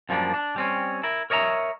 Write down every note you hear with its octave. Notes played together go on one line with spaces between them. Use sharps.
F#2 F3 G3 A#3 D4
D4
G3 C4 C#4
E4 A#4
A#4 C#5 D#5 E5 A#5